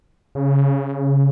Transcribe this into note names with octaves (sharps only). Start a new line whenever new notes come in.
C#3